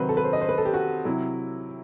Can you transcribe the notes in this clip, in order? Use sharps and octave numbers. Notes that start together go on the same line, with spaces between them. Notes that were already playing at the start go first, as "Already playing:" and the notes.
Already playing: C3 D#3 F#3 B4 C5
A4
B4
C5
D#5
C5
B4
A4
G4
F#4
C3 F#3 E4